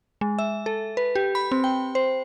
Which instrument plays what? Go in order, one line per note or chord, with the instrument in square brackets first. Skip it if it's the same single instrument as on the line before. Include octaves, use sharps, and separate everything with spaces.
[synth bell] G#3
E5
A4
B4
G4
B5
C4
G5
C5